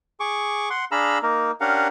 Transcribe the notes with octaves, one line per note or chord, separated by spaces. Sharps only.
G#4 C#6 D6
F#5 C6
D4 G#4 F5 A#5 B5 E6
A#3 D#4 A#4
C#4 D4 G4 A#4 F5 F#5